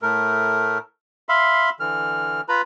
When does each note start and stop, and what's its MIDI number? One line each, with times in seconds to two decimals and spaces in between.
0.02 0.78 45
0.02 0.78 57
0.02 0.78 70
1.29 1.70 76
1.29 1.70 77
1.29 1.70 83
1.29 1.70 84
1.80 2.41 50
1.80 2.41 52
1.80 2.41 89
2.49 2.62 65
2.49 2.62 71
2.49 2.62 82
2.49 2.62 83